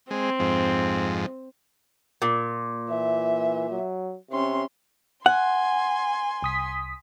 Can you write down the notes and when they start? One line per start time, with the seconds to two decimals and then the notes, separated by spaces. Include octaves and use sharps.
0.11 G#3 C4
0.39 F2 G#2
2.22 A#2
2.90 E3 E5
3.71 F#3
4.31 C3 C#4 C6
5.26 F#5 G#5 C6
6.42 C2 D#6 B6